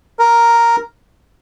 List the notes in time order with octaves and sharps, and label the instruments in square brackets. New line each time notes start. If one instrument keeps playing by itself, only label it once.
[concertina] A#4